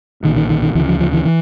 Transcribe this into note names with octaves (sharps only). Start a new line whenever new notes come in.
B1 A#2 D#3
D#3
D#3
D#3
D2 C#3 E3
F3
F3
E3
E3